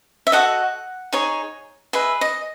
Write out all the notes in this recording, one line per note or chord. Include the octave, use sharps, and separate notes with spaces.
E5
F#4 A4 D#5 F#5
D#4 G#4 C#5
G#4 B4 D#5 E5
D#5